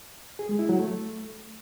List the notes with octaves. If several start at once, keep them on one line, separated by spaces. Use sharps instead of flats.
G#4
G#3
E4
F#3
A3